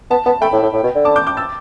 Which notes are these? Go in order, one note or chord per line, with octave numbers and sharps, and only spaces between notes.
B3 A5
B3 A5
A3 G5 B5
A2
A2
A2
B2
D3
A5 D6
D6 G6
D6 G6
E6 A6